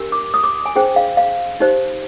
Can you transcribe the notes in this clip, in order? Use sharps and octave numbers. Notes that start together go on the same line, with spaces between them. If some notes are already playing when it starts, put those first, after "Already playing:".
Already playing: D4 G4 A#4
D6
D#6
D6
G#5
D4 G#4 C5 G5
F5
F5
D#4 G4 C5